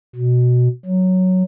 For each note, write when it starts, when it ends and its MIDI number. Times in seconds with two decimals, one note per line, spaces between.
0.16 0.68 47
0.85 1.43 54